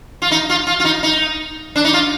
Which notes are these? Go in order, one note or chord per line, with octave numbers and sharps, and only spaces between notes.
F4
D#4
F4
F4
F4
D#4
D#4
D4
D#4
F4